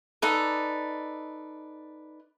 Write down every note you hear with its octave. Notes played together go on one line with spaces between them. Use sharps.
D#4 A4 B4 D5